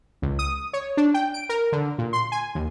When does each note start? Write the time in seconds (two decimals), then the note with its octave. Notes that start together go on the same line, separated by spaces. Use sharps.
0.22 C#2
0.39 D#6
0.73 C#5
0.97 D4
1.14 G5
1.34 D7
1.49 A#4
1.72 D3
1.98 A#2
2.13 C6
2.32 G#5
2.55 D#2